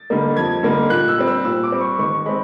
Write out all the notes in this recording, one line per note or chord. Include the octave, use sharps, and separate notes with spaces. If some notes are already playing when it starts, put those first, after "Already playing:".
Already playing: A6
D3 G3 A#3 D#4
F2 G#6
D3 G3 A#3 D#4
A#2 F#6
E6
G3 C4
E6
A#2 E6
D6
G3 C4
C#6
D#3 C#6
G#3 C4 B5